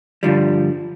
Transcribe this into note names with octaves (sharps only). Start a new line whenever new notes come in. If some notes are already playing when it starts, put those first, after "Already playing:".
G2 D3 F3 G3